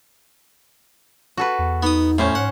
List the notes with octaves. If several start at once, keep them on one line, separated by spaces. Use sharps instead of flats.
F#4 A4 B4
E2
B3 D#4 D#6
A2 C#4 C5 F5
G#2 C#5 F#5